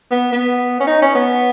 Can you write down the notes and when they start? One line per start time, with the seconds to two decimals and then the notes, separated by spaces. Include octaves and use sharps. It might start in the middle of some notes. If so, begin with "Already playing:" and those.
0.12 B3
0.32 B3
0.80 C#4
0.87 D#4
1.02 C#4
1.15 B3